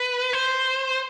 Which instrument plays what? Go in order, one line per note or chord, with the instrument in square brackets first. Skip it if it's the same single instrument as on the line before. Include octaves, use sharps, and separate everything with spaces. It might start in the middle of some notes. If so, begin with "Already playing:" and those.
Already playing: [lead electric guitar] B4
C5